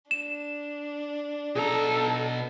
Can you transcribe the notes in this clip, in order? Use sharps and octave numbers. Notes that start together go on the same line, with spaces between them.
D4 E7
B2 A4 A#5